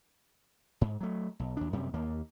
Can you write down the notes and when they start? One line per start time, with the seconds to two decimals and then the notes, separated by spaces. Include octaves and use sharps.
0.81 G#2
1.00 F#3 A3
1.39 B1
1.57 D#2 D4
1.73 F#2 C3 G3
1.94 D#2 A#3